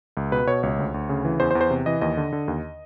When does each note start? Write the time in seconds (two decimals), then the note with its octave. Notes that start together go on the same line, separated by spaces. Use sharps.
0.17 C#2
0.32 B2 B4
0.47 B2 C#5
0.63 C#2 C#5
0.79 D2
0.94 D2
1.09 C#3
1.25 E3
1.40 E2 C5
1.51 C5
1.55 E2
1.61 C5
1.70 C3
1.86 E3 D#5
2.01 D#2 D#5
2.17 D3
2.32 D3
2.48 D#2